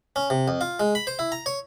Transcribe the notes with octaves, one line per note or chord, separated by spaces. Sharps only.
C#4
C3
F2
F4
G#3
B5
C5
E4
A#5
C#5